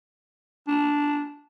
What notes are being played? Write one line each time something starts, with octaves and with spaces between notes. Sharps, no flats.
D4